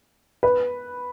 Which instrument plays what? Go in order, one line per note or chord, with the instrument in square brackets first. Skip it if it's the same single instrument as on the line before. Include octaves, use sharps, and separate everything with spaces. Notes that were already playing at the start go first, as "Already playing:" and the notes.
[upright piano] B4